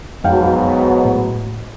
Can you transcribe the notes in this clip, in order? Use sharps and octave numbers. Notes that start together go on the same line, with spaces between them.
F2 G#2 B2 F#3 F5 G5
A2